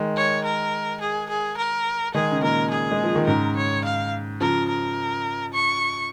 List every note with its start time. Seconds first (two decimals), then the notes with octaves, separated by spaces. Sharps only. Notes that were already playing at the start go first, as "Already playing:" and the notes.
Already playing: D#3 G#3
0.16 C#5
0.44 A#4
1.01 G#4
1.29 G#4
1.57 A#4
2.14 D#3 G#3 G#4
2.32 C#3
2.42 A#2 D#3 A#4
2.70 G#4
2.92 G#3
3.04 F3
3.15 D#3
3.27 G#2 C#3 A#4
3.56 C#5
3.85 F5
4.41 C#3 F3 A#4
4.69 A#4
5.53 C#6